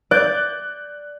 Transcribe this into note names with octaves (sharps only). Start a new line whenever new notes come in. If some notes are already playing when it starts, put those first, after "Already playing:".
D5 F#6 G6